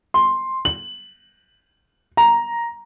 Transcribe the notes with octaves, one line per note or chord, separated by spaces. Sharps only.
C6
F#7
A#5